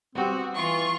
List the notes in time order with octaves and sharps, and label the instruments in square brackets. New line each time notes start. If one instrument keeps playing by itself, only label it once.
[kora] G3 B3 [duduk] C4 [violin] F#4
[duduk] E3 [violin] F4 [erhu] C#6